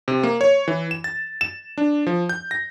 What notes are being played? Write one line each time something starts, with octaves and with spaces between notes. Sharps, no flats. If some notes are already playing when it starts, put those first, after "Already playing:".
C3
A#3
C#5
E3
E7
A6
E7
D4
F3
G6
A#6